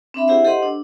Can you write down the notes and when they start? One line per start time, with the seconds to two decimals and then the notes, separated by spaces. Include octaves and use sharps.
0.14 C4 D4 E5 B5
0.27 E4 G4 G#4 C5 E5 F#5
0.45 G4 A4 C5 D#5 F#5 C6
0.63 D4